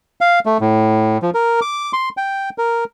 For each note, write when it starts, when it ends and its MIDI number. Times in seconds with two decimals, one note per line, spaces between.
0.21 0.39 77
0.46 0.58 57
0.61 1.18 45
1.22 1.30 53
1.34 1.60 70
1.61 1.92 86
1.93 2.09 84
2.17 2.50 79
2.58 2.84 70